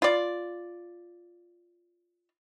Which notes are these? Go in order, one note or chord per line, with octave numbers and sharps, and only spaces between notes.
F4 D5